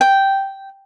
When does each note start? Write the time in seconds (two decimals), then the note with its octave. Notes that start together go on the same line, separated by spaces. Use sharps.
0.01 G5